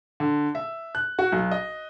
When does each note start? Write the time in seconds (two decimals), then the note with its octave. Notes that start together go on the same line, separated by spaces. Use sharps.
0.20 D3
0.55 E5
0.95 F#6
1.19 F#4
1.32 B1
1.51 D#5